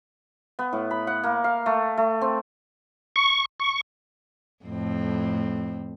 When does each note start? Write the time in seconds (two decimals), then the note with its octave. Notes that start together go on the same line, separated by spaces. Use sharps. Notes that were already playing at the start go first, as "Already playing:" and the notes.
0.59 B3
0.73 A2
0.91 B5
1.07 F#5
1.23 A#3
1.44 F5
1.66 A3
1.97 A3
2.21 C4
3.16 C#6
3.60 C#6
4.65 F2 A2 C4